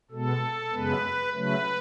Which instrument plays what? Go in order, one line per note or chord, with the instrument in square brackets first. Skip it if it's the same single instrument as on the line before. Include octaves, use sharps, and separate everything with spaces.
[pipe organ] B2 G#3 B3 A4
F#2 C#3 G#3 B3 B4
C#3 F#3 A3 B4